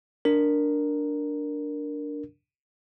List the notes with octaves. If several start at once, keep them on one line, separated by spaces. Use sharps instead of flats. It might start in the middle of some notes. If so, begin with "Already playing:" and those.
D4 A#4